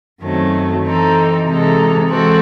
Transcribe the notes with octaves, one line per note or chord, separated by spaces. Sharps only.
F#2 D#3 F#3 A3 C4
E3 C4 D#4 A4
C3 E3 G#3 D#4 A4
E3 G#3 C4 F#4 A4